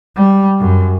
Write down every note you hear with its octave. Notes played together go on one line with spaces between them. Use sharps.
G3
F#2